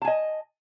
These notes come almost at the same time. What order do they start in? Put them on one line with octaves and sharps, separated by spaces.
A5 G#5 D#5